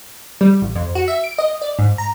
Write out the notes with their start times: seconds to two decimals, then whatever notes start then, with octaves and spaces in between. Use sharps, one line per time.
0.41 G3
0.62 A1
0.76 F2
0.95 F#4
1.08 E5
1.24 D7
1.38 D#5
1.62 D5
1.79 G#2
1.98 A#5